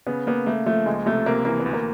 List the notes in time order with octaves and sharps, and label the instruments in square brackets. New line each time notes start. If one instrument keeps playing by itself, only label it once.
[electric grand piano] C#3 [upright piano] B3
[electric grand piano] A#3 [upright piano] B3
[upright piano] A3 [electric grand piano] A#3
[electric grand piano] F3 [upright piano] A3
[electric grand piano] C#2 [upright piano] G#3
[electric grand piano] C3 [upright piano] A3
[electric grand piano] C3 [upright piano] A#3
[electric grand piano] E3 [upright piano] A#3
[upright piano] B3
[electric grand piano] D2
[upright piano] A#3